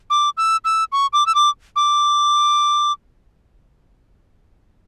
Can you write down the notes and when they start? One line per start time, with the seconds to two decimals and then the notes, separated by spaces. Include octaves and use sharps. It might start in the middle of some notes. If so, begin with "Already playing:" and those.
0.10 D6
0.37 E6
0.65 E6
0.92 C#6
1.13 D6
1.26 E6
1.35 D6
1.76 D6